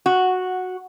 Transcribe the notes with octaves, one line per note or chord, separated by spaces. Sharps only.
F#4